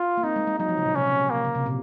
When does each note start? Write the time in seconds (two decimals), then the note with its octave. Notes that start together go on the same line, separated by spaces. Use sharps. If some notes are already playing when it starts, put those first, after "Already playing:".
Already playing: F4
0.17 A#3
0.23 C4 D#4
0.36 G#3
0.47 G#3
0.59 F#3 D#4
0.69 F3
0.77 C#3
0.85 A#2
0.95 C3 C#4
1.30 A#3
1.45 C#3
1.55 C3
1.66 A#2